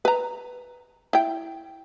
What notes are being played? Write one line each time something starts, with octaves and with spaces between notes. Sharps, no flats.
B4 A#5
E4 G5